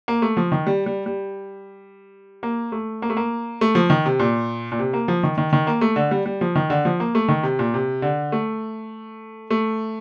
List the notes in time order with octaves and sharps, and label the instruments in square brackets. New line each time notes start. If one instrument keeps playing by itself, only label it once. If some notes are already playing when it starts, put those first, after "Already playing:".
[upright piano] A#3
A3
F3
D#3
G3
G3
G3
A#3
A3
A#3
A3
A#3
A3
F3
D#3
C3
A#2
A#2
C3
A#3
F3
D#3
D#3
D#3
A#3
A3
D3
G3
G3
F3
D#3
D3
F3
A#3
A3
D#3
C3
A#2
C3
D3
A3
A3